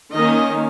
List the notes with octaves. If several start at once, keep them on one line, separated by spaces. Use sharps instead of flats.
D#3 A#3 C#4 D#5